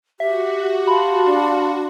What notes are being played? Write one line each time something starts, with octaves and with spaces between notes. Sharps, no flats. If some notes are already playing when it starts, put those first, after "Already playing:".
F#4 G4 E5
F5 A5 B5 C6
D4